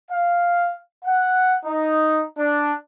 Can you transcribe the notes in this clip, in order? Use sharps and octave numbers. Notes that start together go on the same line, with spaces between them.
F5
F#5
D#4
D4